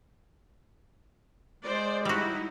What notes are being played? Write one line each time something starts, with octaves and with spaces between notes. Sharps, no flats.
G#3 C5 D5
G3 D#4 E4 F#4